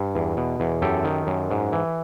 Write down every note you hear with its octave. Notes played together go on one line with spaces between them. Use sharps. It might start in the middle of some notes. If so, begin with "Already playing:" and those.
Already playing: G2
E2
B2
E2
F#2 G4 A4
D#3
F#2
G#2
E3